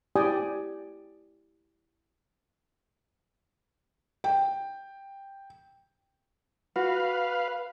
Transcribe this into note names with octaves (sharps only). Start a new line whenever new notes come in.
E4 G4 D5 G5 G#5 D#6
G5
F#4 B4 F5